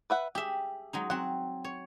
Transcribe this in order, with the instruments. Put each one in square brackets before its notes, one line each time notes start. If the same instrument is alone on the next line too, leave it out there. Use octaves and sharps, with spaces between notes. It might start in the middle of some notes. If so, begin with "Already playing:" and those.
[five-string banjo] B4 E5 F#5
[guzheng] G4 E5 [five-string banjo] G#4
[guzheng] F#3 G#3 D#4
[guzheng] F#3 C4 [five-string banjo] F#5
[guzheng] C#5